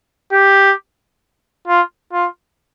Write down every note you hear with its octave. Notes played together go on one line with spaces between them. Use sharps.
G4
F4
F4